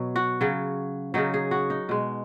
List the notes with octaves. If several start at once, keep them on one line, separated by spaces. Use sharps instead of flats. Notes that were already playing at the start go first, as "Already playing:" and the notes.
Already playing: B2 F#3
F#4
C#3 F#3
C#3 F#3 D#4
G#4
F#4
D#4
B2 G#3